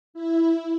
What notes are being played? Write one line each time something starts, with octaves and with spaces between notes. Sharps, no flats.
E4